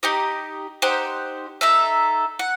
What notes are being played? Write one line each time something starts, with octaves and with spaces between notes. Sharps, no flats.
D#4 G4 D#5
D#4 G4 C5 F#5
D#4 A4 E5
F#5